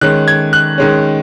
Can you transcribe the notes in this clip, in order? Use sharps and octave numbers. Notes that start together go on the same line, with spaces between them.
D#3 G#3 C#4 F#6
G#6
F#6
D#3 G#3 C#4